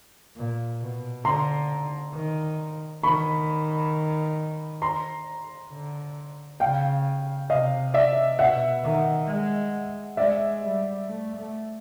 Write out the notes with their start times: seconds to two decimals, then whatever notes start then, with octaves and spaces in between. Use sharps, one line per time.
0.36 A#2
0.80 B2
1.25 D3 A#5 C6
2.14 D#3
3.03 D#3 B5 C#6
4.82 A#5 C6
5.72 D3
6.60 C#3 F5 G5
7.50 C3 D#5 F5
7.94 D5 E5
8.39 B2 E5 F#5
8.84 D#3
9.28 G#3
10.17 G#3 D5 E5
10.62 G3
11.07 A3
11.36 A3